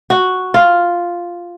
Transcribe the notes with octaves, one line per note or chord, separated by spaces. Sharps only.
F#4
F4